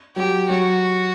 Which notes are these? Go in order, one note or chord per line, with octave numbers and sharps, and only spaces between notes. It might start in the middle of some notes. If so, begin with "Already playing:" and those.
F#3 G4
F#3 F#4